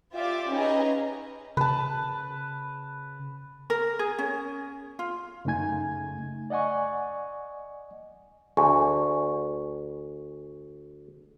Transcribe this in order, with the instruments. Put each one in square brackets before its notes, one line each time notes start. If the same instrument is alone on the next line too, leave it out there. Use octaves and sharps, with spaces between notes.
[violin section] F4 G4 D5 E5 D6
C#4 D#4 G#4 B4 D#5 A#5
[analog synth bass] C#3 [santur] B4 A5
[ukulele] A#4
G#4
C#4
F4
[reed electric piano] F#2 C#3 A3 D#4 G#5 G#6
D5 D#5 F#5 G#5 C#6
[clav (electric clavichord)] D2 [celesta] G#4 G#5 C#6